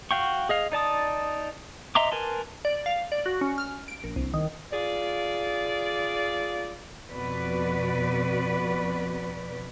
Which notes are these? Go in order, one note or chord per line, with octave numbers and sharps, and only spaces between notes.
F#4 F5 G5 C#6
G#4 D#5 F5
D#4 D5 A5 D#6
D#5 E5 A#5 C6 D6
A#4 B4 G#5 A5 C6
D5
F5
D5
F#4
C#4
F6
D7
A#1
C2
D#3
F4 G#4 D5
F2 B2 F3 F#4 B4 D5